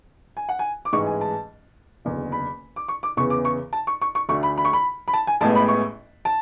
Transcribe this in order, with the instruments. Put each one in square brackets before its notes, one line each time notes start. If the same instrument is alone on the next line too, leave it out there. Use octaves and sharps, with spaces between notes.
[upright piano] G#5
F#5
G#5
D6
A1 G#2 E3 G#3 C#6
G#5
A5
F#1 E2 D3
B5
D6
C#6
D6
E2 C#3 E3 B3 C#6
D6
C#6
A5
C#6
C#6
C#6
D2 D3 A3 C#6
B5
B5
C#6
B5
B5
A5
G#5
A1 A2 G#3 B3 A5
B5
C#6
A5